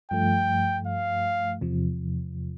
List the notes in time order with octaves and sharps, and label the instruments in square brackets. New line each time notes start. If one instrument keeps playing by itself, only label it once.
[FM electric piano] G2 F3 A3 [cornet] G5
[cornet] F5
[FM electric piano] E2 C3 F3